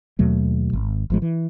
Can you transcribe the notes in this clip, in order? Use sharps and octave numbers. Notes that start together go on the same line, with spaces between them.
D#2 B2 F#3 A3
G#1
G#1 F3 G#3
E3